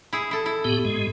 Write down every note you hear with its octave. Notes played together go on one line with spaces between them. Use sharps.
E4 G#4
E4 A4
E4
A2 B3 G4
G#2 G#3